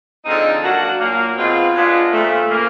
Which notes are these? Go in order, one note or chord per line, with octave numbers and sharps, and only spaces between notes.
D3 F3 G#3 C4 D#4
F#3 A#3 D4 F#4
A#2 F#3 A#3
B2 G#3 C4 F4
G#3 B3 D4 F4
A#2 F3 A3
C#3 F3 A#3